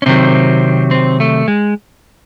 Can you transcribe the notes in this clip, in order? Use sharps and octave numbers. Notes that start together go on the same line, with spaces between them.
C#4
C3 D#3 F#3 C4
C4
A3
G#3